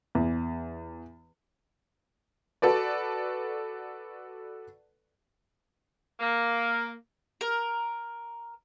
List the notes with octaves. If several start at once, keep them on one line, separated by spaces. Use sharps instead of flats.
E2
F#4 A4 B4 D5
A#3
A#4